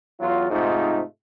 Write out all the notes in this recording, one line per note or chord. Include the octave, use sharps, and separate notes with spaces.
E2 F#3 F4
G#2 C3 A3 D#4 F4